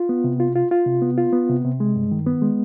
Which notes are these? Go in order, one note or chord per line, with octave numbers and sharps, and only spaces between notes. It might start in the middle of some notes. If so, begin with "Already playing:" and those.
Already playing: F4
B3
C3
F4
F4
F4
C3
B3
F4
B3
C3
C3
G#3
G2
D#3
B3
G#3